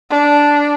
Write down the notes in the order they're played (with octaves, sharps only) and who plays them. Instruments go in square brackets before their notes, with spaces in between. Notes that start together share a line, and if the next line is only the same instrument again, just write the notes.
[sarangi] D4